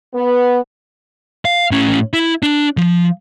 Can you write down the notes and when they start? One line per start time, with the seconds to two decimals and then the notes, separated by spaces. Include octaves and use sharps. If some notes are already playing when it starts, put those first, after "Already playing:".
0.14 B3
1.45 F5
1.71 A2 C#4
2.13 E4
2.43 D4
2.77 F3